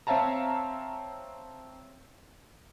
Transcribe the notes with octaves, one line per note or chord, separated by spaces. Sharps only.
C4 C#5 E5 F5 A5 A#5